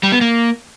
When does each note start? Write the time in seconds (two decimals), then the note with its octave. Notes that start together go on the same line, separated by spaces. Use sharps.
0.03 G3
0.12 B3
0.21 A#3